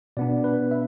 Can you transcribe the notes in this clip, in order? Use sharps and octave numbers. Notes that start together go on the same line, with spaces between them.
B2 B3 D4 D5
B4
E5